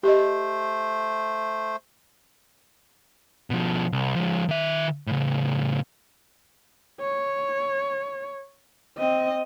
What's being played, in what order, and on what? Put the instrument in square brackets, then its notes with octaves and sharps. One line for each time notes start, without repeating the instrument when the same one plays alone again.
[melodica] A3 C5 [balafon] G4 D#5
[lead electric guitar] B2 F3
C2
F3 G#3
D#3 E5
A2 C#3
[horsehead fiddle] C#5
C4 D#5